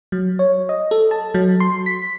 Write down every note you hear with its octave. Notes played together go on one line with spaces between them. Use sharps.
F#3
C#5
D#5
A4
A5
F#3
C6
B6